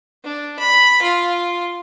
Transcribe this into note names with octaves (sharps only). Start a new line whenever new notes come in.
D4
B5
F4